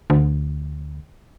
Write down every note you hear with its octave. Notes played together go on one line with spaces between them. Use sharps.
D2